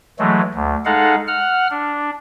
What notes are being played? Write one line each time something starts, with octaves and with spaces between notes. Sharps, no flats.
E3 F#3 G#3 A3
D2
G#3 D#4 A4 F5 F#5
F#5 F6
D4